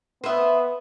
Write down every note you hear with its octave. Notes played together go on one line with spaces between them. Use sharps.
B3 B4 C5 E5